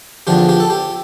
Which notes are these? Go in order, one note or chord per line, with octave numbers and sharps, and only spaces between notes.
E2 D3 F3 G4
G4
A4
G4